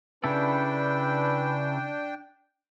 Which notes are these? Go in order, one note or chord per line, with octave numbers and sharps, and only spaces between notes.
C#3 D4 E4 A4 B4 G5